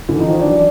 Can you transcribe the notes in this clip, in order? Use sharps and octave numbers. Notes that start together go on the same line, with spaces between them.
D3 E3
D#4
E3
D#3 F3
D4
E3 F#3